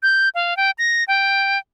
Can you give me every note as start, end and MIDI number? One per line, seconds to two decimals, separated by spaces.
0.03 0.29 91
0.35 0.57 77
0.57 0.71 79
0.78 1.04 94
1.08 1.58 79